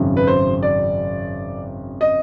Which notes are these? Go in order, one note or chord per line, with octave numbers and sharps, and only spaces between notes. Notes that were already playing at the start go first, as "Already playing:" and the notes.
Already playing: G#1 F#2 C#3
B4
C5
D5
D#5